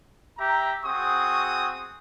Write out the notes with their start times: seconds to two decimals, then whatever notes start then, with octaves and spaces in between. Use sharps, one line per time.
0.38 G4 E5 A#5
0.84 C4 F#4 G#4 C#6 D#6